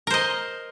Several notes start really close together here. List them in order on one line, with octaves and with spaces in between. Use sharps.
A#4 C5 D#5